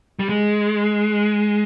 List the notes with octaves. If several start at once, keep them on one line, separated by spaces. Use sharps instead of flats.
G3
G#3